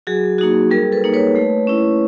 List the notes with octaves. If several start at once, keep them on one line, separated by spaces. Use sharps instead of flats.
F#3 F#4 G#4
A#3 D#4 F#4 G#4
G3 G#4 A#4
A4 B4
A#3 D#4
B4 C#5
A3
C#4 E4